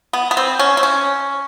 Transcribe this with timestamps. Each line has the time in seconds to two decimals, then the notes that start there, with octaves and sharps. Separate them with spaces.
0.13 B3
0.31 B3
0.37 C4
0.59 C#4
0.77 C4
0.83 C#4